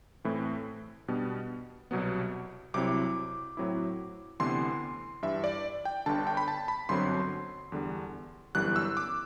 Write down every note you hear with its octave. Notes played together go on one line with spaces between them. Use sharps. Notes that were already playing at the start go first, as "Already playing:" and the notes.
A2 E3 A3 C4 E4
B2 G3 B3 D4
C2 B2 F#3 B3
C2 C3 F#3 C4 E4 D6
A2 F#3 C4 E4
D2 C3 E3 B3 D4 C6
G2 E3 G3 E5
D5
G5
G1 G2 D3 A5
G5
B5
A5
B5
G1 F#2 D3 F#3 C4 C6
E2 D3 G3
G1 F#2 E3 G3 B3 F#6
E6
D6